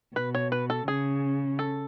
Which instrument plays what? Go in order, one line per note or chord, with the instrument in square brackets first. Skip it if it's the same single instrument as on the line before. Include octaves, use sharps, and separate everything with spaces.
[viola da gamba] B2 [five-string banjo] B4
[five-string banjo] C#5
B4
A4
[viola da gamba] C#3 [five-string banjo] G#4
[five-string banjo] A4